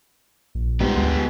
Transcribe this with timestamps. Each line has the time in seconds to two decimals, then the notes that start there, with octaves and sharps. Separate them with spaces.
0.55 A#1
0.80 G#2 G3 B3 G4
0.96 D2 G#3